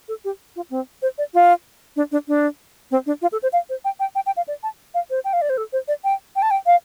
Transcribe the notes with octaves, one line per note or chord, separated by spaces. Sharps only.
A4
G4
F4
C4
C5
D5
F4
D4
D4
D4
C4
D4
F4
A4
C5
F5
C5
G5
G5
G5
G5
F5
D5
A5
F5
C5
G5
F5
D5
C5
A4
C5
D5
G5
G5
A5
G5
F5